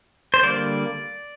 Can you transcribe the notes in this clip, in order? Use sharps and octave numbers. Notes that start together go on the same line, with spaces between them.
C5
D3 G3 A#3 D5